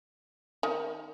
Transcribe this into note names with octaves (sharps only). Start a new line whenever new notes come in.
D#3